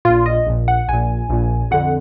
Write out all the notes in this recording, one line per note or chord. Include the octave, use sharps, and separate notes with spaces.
A#2 F4
A#1
D#5
A#1 A#2
F#5
A#1 A#2 G#5
A#1 A#2
F2 D3 F#5